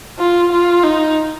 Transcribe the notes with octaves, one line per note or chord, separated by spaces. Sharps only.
F4
F4
D#4